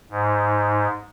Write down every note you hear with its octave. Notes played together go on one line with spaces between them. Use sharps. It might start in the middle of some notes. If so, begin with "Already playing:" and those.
G#2